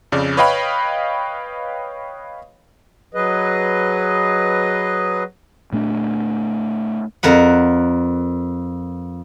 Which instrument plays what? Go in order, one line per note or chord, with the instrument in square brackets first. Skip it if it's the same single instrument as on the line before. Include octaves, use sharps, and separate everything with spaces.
[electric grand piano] F2 C#3 D5
B4 C#5 D#5 F5 G5 B5
[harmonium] F#3 G#4 B4 D#5
[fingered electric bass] A#2 A3 D4
[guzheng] F2 A#4 B4 F#5